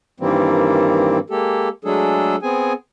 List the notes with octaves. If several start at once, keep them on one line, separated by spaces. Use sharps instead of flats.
G2 D#3 E3 G3 A#3 C4
G#3 A#3 G4 A4
F#3 G#3 A3 D4 G#4 A4
B3 C4 G#4 G#5